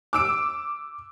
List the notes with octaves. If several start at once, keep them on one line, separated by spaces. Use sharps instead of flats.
D6 E6 D7